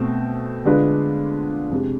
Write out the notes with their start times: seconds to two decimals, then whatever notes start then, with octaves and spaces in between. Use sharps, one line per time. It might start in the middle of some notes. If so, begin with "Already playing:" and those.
Already playing: B2 A3 C4
0.65 D3 G#3 D4 F4 B4
1.71 F2 C3 G#3